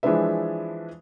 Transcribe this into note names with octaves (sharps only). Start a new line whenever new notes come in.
E3 F3 G#3 D4 B4 E5